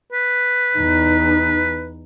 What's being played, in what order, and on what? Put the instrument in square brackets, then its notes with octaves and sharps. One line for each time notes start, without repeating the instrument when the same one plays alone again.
[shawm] B4
[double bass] E2 D#4